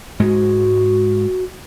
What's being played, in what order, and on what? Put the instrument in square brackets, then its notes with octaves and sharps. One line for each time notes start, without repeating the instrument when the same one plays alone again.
[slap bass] G#2 G#3 [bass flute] F#4